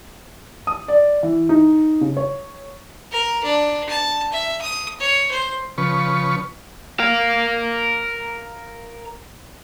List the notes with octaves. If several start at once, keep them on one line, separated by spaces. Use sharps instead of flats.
D#6
D5
E3
D#4
C#3
C#5
A#4
D4
A5
E5
D#6
C#5
C5
C#3 F3 B4 C#6
A#4 F5